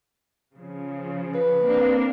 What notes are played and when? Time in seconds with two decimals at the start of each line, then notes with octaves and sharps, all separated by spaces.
0.55 C#3 F3
1.34 B4
1.63 A#3 C4 D4